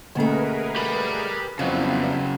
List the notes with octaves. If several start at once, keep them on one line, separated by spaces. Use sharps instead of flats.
B2 D3 A3 A#3 C#4 G#4 A#4 B4
G4 B5
F2 C#3 F#3 G3 B3 E4